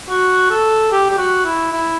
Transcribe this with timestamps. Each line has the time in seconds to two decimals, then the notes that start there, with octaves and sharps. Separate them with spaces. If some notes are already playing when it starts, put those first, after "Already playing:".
0.10 F#4
0.50 A4
0.92 G4
1.10 G4
1.18 F#4
1.45 E4
1.72 E4